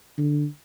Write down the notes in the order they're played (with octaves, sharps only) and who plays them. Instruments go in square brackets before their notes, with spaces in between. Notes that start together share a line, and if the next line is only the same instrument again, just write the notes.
[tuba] D3